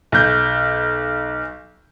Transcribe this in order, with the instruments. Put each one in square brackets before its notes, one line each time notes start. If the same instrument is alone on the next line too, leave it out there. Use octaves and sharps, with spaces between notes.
[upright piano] B1 G6